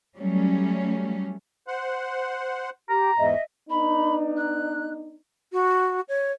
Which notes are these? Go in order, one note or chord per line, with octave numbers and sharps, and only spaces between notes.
F#3 G3 A3 C#4
C5 F#5
G4 A#5
E2 G#2 D#5 E5
B3 D4 D#4 B5
F#6
F#4
C#5